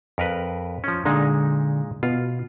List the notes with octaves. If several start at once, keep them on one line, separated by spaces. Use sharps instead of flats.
F2 A#4 B4
F3 C#4
A#2 D3 G#3 D#4
B2 F4